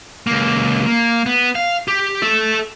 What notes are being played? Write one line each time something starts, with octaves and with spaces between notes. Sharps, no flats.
C#2 A#3
A#3
B3
F5
G4
A4 E5